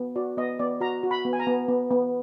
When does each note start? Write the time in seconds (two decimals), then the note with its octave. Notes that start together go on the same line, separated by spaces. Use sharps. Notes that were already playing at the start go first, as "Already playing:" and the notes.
Already playing: B3
0.16 F#4 D5
0.37 B3 D#5
0.59 B3 D5
0.81 F#4 A#5
1.03 F#4
1.11 B5
1.25 B3
1.33 G#5
1.40 A#5
1.47 B3
1.68 B3
1.91 B3